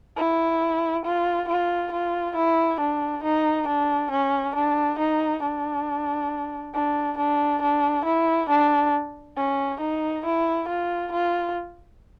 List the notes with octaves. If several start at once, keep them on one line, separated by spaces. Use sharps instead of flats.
E4
F4
F4
F4
E4
D4
D#4
D4
C#4
D4
D#4
D4
D4
D4
D4
E4
D4
C#4
D#4
E4
F4
F4